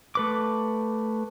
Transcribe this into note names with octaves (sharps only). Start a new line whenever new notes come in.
A3 B4 D6